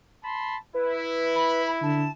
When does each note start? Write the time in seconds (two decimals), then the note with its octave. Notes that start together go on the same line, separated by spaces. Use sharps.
0.23 A5 B5 C6
0.74 E4 B4
1.35 B5
1.82 D3 A5